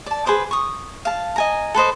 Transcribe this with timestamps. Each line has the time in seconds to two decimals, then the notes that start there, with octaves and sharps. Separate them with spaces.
0.06 D5 A5
0.26 G#4 B4 C5 D6
0.51 C#6 D#6
1.05 F5 A5
1.36 D#5 G#5 A#5
1.75 A4 B4 C5 D#5